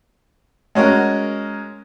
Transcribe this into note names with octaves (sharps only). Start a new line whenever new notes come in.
G#3 C#4 F#4 A#4